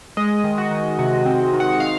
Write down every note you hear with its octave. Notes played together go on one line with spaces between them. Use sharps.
G#3 D#5
D#3
F#4
D#3
C3 F#4
C4
D#3
F#5
F5